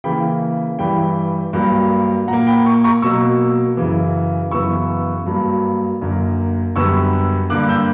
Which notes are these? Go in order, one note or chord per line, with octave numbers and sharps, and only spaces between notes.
C#3 E3 A#3 G5 B5
G2 E3 G3 G5 B5
G2 F#3 A#3
A#2 F#5 A#5
A#3
G5 B5
A#5 C#6
A#5 C#6
B2 F#3 A#3 C#6 E6
F#2 C#3 E3
F#2 C#3 E3 B3 C#6 E6
G2 F#3 A#3
F#2 D3 A#3
F#2 D3 G3 B3 C#6 E6
G2 D3 A#3 D6 F#6
E6 G6